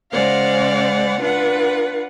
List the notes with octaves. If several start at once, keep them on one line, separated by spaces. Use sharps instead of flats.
C#3 G#3 C5 D5 F5 F#5
D4 F4 B4 F#5